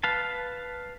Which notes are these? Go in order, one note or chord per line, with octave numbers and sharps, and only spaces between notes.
B4 F5 A5